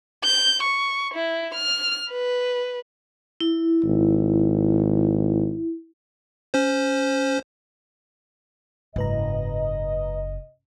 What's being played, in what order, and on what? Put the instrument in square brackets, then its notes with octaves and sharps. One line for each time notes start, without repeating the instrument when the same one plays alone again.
[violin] G6
C#6
E4
F6
B4
[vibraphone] E4
[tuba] G#1
[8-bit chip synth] C#4 C5
[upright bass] F#1 [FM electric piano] G#2 B4 A#5 [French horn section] D#5